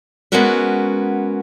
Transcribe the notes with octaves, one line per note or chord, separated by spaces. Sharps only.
G#3 B3 C#4 F#4 A#4 B4